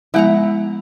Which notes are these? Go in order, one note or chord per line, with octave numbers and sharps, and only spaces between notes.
F3 G#3 B3 E4 F#5 A#5